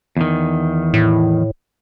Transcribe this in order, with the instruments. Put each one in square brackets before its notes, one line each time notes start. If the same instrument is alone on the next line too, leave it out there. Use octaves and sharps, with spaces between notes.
[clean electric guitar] E2 D#3
[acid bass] A2